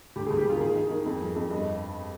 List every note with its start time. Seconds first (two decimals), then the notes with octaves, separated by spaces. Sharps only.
0.16 D2 G4
0.27 D2 G#4
0.39 G4
0.46 D2 F4
0.56 A#4
0.60 D#3 G#4
0.75 D#3
0.90 D#3
1.06 F2
1.21 F3
1.36 F2
1.50 G2 D#5